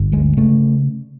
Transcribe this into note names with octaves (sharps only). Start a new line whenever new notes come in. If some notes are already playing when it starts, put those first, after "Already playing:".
Already playing: G1
D2 G#3
C#3 A3